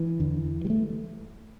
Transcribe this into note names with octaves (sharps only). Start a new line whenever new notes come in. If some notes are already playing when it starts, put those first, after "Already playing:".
Already playing: E3
E2 D3
G3
A3